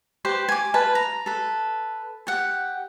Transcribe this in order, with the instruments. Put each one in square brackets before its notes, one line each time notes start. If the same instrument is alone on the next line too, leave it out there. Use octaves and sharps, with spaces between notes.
[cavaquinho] G4 B4 C5
G#5 D6
F4 B4 A5
A#5
A4 B4
G4 F#5